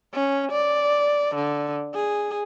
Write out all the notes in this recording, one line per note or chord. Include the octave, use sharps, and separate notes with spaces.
C#4
D5
D3
G#4